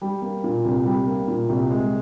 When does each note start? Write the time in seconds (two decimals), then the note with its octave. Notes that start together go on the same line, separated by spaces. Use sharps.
0.02 G3
0.22 A#3
0.44 A#2
0.65 C2
0.86 G3
1.07 A#3
1.28 A#2
1.49 C2
1.70 G#3